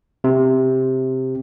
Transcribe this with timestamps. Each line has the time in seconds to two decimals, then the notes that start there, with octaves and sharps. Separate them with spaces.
0.24 C3